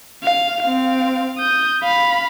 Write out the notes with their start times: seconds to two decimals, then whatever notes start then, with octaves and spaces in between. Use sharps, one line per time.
0.23 F5
0.63 C4 F5
1.38 D#6 G6
1.84 F5 B5